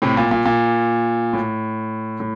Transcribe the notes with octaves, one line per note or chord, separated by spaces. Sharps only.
A2 C3
A#2
A#2
A#2
A2
A2